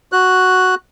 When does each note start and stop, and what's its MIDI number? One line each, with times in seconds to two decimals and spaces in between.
0.12 0.75 66
0.12 0.75 90